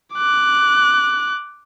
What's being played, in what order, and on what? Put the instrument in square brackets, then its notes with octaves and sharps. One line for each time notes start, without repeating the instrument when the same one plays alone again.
[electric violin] D6 F#6